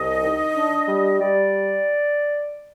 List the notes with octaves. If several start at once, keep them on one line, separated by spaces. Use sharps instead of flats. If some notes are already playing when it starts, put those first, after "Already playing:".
Already playing: C2 D#5
D#3
D4
G3
G3 D5